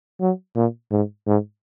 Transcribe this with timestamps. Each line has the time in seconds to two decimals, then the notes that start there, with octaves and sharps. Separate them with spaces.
0.20 F#3
0.55 A#2
0.91 G#2
1.27 G#2